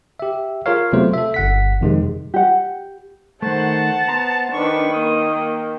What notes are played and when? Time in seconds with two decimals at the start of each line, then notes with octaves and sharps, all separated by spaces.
0.20 G4 E5
0.66 F4 G#4 A#4 C#5 F5
0.93 C3 F#3 A3 B3 F4 C5
1.14 A4 E5
1.34 G1 F#5 B6
1.81 F2 C3 D#3 G#3 C4
2.34 G4 F#5
3.42 D#3 A3 C5 F#5 A5
4.09 B3 C5 A#5
4.53 D#3 D4 B4 C#6
4.93 A#3 D#6